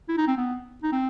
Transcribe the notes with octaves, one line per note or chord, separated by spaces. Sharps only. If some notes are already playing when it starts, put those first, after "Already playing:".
E4
D#4
C4
B3
D#4
C4